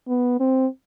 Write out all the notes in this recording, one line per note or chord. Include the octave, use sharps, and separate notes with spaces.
B3
C4